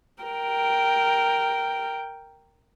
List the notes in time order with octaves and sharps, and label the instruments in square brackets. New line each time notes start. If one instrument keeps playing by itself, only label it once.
[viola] A#4 G5